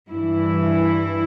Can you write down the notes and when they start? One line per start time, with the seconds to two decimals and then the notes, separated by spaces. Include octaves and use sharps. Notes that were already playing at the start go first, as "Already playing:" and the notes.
0.10 G2 E3 E4